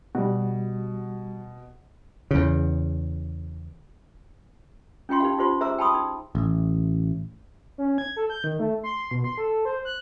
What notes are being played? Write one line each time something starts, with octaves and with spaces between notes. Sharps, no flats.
B2 G3 F#4
E2 C#3
C#4 F4 G5 C6
D#4 G4 F5
D#4 F4 G4 C5 C6
G#4 C5 E5 A#5 C#6 E6
G5 A5 B5 C6 D#6
D#4
A1
C#4
G#6
A4
G6
D#3
A3
C6
B2
C6
A4
C5
F#6